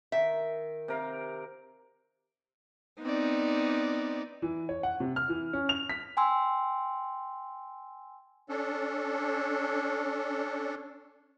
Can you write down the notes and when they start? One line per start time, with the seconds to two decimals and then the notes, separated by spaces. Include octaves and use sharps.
0.12 D#3 E5
0.88 C3 A#4 F5
3.02 B3 C4 D#4 D5
4.42 E3
4.69 C#5
4.83 F#5
5.00 C3
5.16 F6
5.29 E3
5.53 C#4
5.69 F7
5.89 B6
6.17 G5 G#5 C6 E6
8.49 C#4 D4 A4